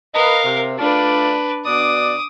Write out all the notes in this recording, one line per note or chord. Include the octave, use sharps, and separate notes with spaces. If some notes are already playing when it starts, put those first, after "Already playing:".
A#4 B4 D#5 F5
C3
A3 D4 F4 B4 D5
B2 D4 D5 D6 D#6